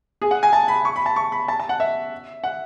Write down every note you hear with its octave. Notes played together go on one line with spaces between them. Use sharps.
G#4
F#5
G#5
A5
B5
C#6
B5
A5
C#6
B5
A5
A5
F#5
E5
F#5